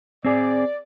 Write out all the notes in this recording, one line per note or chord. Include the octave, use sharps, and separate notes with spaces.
C4 G#4 D5